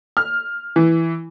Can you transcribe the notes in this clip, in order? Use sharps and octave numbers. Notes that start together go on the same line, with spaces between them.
F6
E3